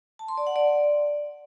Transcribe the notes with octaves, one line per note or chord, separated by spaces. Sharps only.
A5
C6
D5
F#5
D5